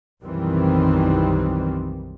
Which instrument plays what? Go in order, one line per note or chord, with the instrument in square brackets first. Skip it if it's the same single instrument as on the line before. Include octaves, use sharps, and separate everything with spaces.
[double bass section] B1 F#2 D#3 E3 G3 C4